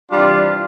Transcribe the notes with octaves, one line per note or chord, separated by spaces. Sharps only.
C3 E3 G3 D4 F4